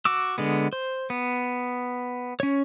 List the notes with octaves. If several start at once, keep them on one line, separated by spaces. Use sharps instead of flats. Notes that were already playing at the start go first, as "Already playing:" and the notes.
F#4 D6 E6
D3 G#3 B3
C5
B3
C#4 C#5